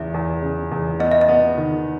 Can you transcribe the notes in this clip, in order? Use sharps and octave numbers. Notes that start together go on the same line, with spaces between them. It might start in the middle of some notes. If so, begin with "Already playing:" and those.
Already playing: E2 C#3 E5
E2
C#3
E2
B3 D#5
E5
D#5
B3
D#3